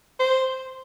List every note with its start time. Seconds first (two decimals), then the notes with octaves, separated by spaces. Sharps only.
0.19 C5